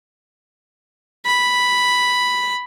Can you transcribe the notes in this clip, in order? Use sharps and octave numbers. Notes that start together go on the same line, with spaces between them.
B5